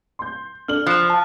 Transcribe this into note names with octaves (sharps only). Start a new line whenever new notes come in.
C6 G6
D4 A4 F6 F#7
F3 F#6 E7
A5